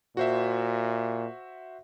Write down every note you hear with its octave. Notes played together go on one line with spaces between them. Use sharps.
A#2 F#4 C5 E5